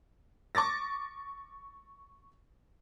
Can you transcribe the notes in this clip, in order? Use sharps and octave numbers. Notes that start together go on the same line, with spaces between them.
C#6 D6 A6 A#6